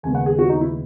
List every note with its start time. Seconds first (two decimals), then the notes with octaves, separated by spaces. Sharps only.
0.03 D#2 C#3 G#3 B3 G#5
0.15 F#5
0.26 G#4
0.39 F#4
0.49 D#4
0.61 E4